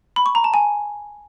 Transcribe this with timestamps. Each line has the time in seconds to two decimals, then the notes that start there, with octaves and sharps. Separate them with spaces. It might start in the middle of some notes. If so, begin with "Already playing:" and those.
0.16 B5
0.26 C#6
0.35 A#5
0.44 A5
0.54 G#5